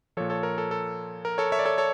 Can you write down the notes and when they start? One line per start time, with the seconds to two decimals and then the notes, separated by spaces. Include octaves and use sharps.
0.17 A#2 F3 A4 C#5
0.30 A4 C#5
0.43 A#4
0.58 A4
0.71 A4
1.25 A#4
1.38 A4 C#5
1.52 C#5 E5
1.59 D5
1.65 A4 C#5
1.78 A4 C#5